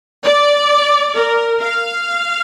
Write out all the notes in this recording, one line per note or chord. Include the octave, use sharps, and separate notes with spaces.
D5
A#4
F5